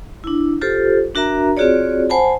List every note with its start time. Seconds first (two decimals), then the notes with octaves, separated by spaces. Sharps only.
0.24 D4 E4
0.61 F4 G4 A4 C5
1.15 D4 F#4 A#4 E5 A#5
1.57 C4 F4 F#4 G#4 C#5 D5
2.10 C5 F#5 G#5 A5 B5